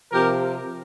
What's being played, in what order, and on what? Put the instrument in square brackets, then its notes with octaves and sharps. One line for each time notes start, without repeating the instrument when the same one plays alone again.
[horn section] C3 F3 G4 A#4